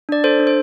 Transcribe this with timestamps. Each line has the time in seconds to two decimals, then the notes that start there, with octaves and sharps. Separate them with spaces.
0.09 D4 D5
0.24 A4 C5
0.39 D4
0.47 C5